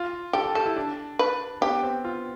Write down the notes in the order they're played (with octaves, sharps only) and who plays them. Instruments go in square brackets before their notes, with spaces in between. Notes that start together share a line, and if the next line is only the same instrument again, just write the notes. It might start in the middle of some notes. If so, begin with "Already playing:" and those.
Already playing: [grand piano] F4
[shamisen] G4 [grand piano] A4
[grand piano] A4
[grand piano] G4 [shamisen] A4
[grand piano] E4
D4
[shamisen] B4
[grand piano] B3 [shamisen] G4
[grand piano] C4
F4